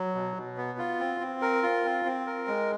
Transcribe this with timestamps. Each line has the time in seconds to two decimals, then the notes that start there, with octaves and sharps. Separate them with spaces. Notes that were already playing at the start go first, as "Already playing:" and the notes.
Already playing: F#3
0.15 B2
0.36 B2
0.57 B3
0.78 F4
1.00 C4
1.20 C4
1.42 A#4
1.63 F4
1.85 C4
2.05 C4
2.27 A#4
2.48 G#3